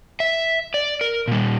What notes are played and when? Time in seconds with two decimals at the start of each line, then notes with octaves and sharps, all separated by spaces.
0.20 E5
0.74 D5
1.01 A#4
1.28 A#2 G3